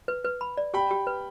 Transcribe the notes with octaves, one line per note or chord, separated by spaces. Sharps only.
B4
B4
B5
D5
G4 G5 B5
G4
B4